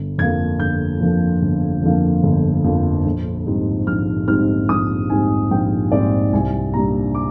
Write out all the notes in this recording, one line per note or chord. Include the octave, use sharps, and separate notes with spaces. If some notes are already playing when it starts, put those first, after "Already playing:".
Already playing: G1
F2 D3 F3 A#3 G#6
G1 G6
F2 D3 F3 A#3
G1
F2 D3 F3 A#3
G1
F2 D3 F3 A#3
A#1
G#2 G3 C4 D#4
A#1 F6
G#2 G3 C4 D#4 F6
A#1 D#6
G#2 G3 C4 D#4 G#5
A#1 G5
G#2 G3 C4 D#4 D5
C2 G#5
A#2 G3 D4 A#5
D6